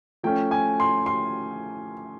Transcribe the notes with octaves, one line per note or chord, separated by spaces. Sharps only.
F3 A3 C#4 G5
G#5
C6
C6